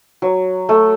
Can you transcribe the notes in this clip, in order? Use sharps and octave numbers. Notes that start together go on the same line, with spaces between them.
F#3
A3